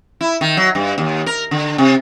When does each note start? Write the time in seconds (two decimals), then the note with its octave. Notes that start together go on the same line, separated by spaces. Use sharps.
0.21 E4
0.41 D#3
0.57 F#3
0.75 G2
0.98 D#2
1.26 A#4
1.51 D3
1.78 C3